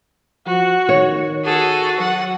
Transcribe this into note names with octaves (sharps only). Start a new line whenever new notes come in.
F3 F#4
D#3 C#5
F#4 G#4 A4
F#3 F#5